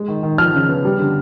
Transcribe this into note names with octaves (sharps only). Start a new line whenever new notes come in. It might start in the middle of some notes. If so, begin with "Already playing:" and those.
Already playing: G#3
D#3
D#3
F3 F6
C#3
B3
G3
D3